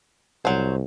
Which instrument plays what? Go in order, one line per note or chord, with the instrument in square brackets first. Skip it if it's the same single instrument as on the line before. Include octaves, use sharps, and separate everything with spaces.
[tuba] C2 [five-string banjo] F#3 C5